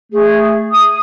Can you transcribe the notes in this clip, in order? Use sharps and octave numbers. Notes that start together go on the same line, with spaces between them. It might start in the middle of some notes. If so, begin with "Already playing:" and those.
A3 G#4
D#6